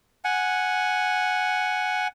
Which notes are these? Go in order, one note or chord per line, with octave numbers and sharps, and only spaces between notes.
F#5 G#5